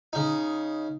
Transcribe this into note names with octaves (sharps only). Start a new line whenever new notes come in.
C#3 D#4